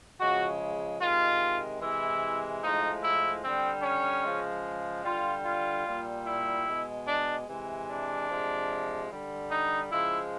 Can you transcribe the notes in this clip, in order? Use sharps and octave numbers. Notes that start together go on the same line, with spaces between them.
C#3 F3 G#3 F#4
C3 D#3 G#3 F4
C3 E3 G#3 E4
A2 F3 G#3 D#4
E4
D3 G3 C4
C#4
C#3 F3 G#3
D3 G3 F4
F4
A#2 G3
E4
B2 G#3
D4
C3 E3 G#3
D4
C3 F3 G#3
D3 G3
D#4
C#3 F3 G#3 E4